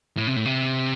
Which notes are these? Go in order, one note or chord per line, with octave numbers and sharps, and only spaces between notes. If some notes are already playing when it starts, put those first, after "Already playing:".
A2
C3
A2
C3